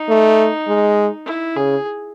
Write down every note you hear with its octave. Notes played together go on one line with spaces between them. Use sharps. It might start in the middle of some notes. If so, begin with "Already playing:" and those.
Already playing: D#4
A3
G#3
E4
C#3 G#4